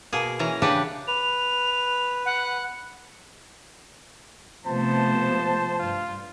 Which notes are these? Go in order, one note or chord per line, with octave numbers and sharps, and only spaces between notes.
B2 A#3 G#4
E3 C#4 A#5
C#3 D4 G4 B4 F#5
B4 F7
F#5
C3 F3 A3 B3 C5 A5
G2 F4